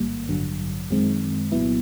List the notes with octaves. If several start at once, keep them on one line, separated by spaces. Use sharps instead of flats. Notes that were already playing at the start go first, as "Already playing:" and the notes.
Already playing: A1 G#2 D#3 G3 A#3
A1 G2 D3 F#3
F#2 D#3 G#3 C4
C2 A#2 F#3 B3 E4